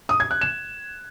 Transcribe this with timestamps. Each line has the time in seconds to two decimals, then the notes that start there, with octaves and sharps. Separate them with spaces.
0.09 D#6
0.20 G#6
0.31 F#6
0.41 E7